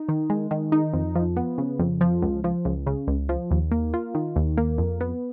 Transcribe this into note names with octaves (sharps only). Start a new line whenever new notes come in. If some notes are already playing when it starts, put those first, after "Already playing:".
Already playing: D#4
D#3
G#3
D#3
D#4
F2
F3
B3
C#3
F2
F3
C#2
F3
C#2
C#3
C#2
F3
D#2
A#3
F4
D#3
D#2
A#3
F2
B3